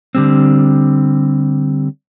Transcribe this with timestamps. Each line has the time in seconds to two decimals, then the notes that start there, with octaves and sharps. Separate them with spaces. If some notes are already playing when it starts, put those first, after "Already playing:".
0.15 D3 G3 C4